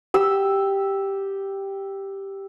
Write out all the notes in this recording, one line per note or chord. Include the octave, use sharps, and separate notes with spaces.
G4 E6